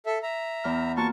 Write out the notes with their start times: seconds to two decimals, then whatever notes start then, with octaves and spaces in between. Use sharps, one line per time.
0.06 A4 E5
0.23 E5 A#5
0.64 E2 F6
0.97 A#3 F4 F#4 A5 C#6